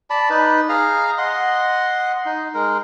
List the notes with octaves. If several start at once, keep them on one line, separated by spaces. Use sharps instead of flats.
D5 A5 B5
D#4 B4
G#4 F5 A#5
D#5 F#5 C6
D#4
G#3 A#4